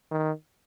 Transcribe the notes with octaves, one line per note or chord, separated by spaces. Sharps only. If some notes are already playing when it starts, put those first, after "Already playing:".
D#3